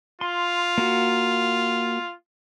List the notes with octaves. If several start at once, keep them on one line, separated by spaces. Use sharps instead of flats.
F4 C6
A#3 F#4